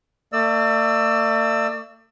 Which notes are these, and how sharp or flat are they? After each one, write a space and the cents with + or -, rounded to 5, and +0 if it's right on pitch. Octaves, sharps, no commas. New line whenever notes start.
A3 +45 D5 +35 E6 +0